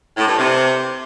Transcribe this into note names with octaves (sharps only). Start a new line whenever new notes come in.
A2
G2
C3